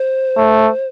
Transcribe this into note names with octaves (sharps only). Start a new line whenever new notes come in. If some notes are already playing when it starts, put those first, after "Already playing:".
Already playing: C5
A3